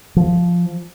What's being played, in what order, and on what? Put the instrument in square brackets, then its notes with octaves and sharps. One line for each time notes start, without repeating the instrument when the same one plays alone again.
[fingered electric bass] F3